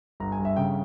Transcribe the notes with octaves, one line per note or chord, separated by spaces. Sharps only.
G1 A#5
G#5
G1
E5
C#3 G5